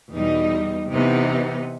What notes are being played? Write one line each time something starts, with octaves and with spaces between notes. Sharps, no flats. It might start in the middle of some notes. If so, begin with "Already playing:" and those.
E2 B2 G3 D#4
C3 E3 B3 D#4